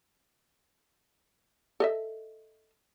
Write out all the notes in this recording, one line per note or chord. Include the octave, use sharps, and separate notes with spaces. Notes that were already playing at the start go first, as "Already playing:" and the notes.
A4 D#5 E5